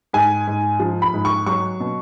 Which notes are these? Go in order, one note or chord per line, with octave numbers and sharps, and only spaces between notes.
G#2 G#5
G#2
F3
B5
G#2
C#6
F#3 C#6
B2